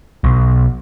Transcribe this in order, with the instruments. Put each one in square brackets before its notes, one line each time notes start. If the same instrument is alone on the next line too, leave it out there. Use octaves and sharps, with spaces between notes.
[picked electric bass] B1